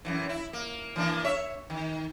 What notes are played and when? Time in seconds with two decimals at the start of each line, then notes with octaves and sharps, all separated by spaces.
0.05 F#2 A2 E3
0.29 E4
0.53 A#3
0.96 E3 A#3 D4
1.24 C#5 E5
1.70 D#3